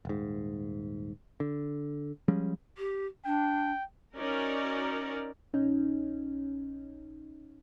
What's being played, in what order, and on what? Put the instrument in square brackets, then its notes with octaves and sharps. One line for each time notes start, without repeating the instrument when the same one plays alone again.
[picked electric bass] D#1 G#2
D3
F3 G3 G#3 C#4
[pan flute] G4
[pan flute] D4 [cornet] G5
[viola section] C#4 D#4 F#4 A#4 D5
[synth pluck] A#1 C#4 D#4